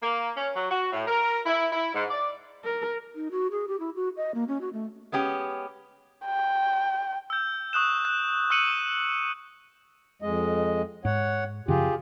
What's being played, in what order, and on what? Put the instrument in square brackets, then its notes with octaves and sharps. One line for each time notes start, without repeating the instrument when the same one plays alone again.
[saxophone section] A#3
C#4
F#3
F#4
A2
A#4
E4
E4
G#2
D5
[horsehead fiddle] A#4
[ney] D#4
F#4
G#4
G4
E4
F#4
D#5
A#3
C#4
F#4
A3
[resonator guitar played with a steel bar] G#3 B3 C#4 G4
[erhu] G5
[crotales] E6 G6
C#6 D#6 F#6 E7
F#6
C#6 E6 F#6 C#7 D#7 F#7
[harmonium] F2 G#3 D#5
[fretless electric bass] G#2 [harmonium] C#5 F#5
[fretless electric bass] F#2 C#3 F3 [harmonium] F4 G4 G#4